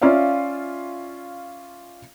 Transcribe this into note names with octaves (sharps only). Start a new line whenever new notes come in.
C#4 F4 D5 E5 F5